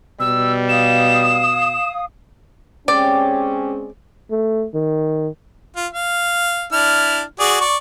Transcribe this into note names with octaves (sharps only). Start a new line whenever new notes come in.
B2 G3 E6
F5 D#6 E7
G#3 C4 C#4 G4 D5
A3
D#3
F4
F5
D4 E4 F6
F#4 G#4 D5
D5 C#6